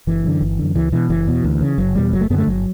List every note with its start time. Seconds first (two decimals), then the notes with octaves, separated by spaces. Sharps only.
0.07 F#1 E3
0.24 F#2 D3
0.41 G1
0.59 F#2 D3
0.75 C#2 E3
0.92 B2 E3
1.10 F#1 E3
1.27 E2 B2
1.44 D2
1.61 C#3
1.78 F#1 F#3
1.95 E2 B2 G3
2.13 F#1 F#3
2.21 A3
2.30 F#2 D3 B3
2.38 A3
2.47 G1 F#3